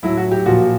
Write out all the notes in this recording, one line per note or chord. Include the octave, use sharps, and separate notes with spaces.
A2 F#3 E4
F#4
G4
A#2 F3 F#4